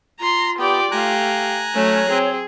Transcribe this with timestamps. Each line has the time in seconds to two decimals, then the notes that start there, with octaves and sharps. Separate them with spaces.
0.19 F4 A#5 C6
0.58 B3 G4 D5 G5 D6
0.91 A3 G4 F5 G#5 A#5 F#6
1.75 F#3 A3 C#4 C#5
2.09 C4 G#4